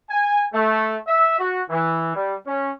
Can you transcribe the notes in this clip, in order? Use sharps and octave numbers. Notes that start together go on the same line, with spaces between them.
G#5
A3
E5
F#4
E3
G3
C#4